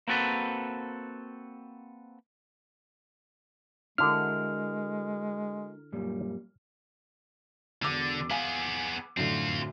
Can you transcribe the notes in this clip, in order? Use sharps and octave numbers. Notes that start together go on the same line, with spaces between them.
A#3 C4 F#4 A4 B4
D3 G#3 D4 E4 F#4 A#4 F6
F#2 A#2 G3
E1 D3 D6 E6
B3 G#4 F5 G#5
F#2 A2 D3 C4 F4